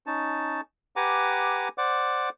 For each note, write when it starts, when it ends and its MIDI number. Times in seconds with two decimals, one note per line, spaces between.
0.06 0.61 61
0.06 0.61 63
0.06 0.61 81
0.96 1.68 67
0.96 1.68 71
0.96 1.68 78
0.96 1.68 80
0.96 1.68 82
0.96 1.68 86
1.78 2.29 72
1.78 2.29 74
1.78 2.29 78
1.78 2.29 86